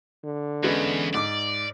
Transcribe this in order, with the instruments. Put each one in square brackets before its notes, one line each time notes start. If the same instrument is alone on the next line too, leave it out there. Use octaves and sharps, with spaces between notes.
[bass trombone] D3
[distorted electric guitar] E2 [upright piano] G#3 C#4 B4
[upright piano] G#2 D6 [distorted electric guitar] D5